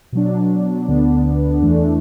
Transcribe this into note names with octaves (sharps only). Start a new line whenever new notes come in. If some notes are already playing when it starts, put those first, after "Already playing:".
B2 F#3 D4
D2 D3 B3 D4
E2 E3 A3 D4